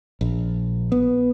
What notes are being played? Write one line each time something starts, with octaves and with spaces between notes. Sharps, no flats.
A#1
B3